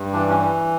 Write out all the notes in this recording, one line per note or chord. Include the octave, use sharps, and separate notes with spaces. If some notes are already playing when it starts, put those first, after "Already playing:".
Already playing: G2
E3 D4
C#4